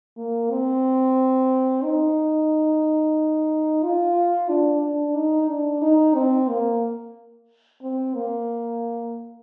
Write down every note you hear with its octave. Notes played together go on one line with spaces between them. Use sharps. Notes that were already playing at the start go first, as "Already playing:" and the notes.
A#3
C4
D#4
F4
D4
D4
D#4
D4
D#4
C4
A#3
C4
A#3